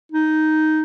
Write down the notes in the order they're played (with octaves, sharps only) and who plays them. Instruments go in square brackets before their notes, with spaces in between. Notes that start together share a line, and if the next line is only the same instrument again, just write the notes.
[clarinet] D#4